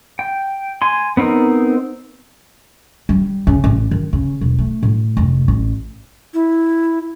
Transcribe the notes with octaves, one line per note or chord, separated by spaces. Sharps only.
G5
G#5 C6
B3 C4 D#4 A#4
G3
C#3
A1
D#3
C#3
E1
A3
A2
F1
A1
E4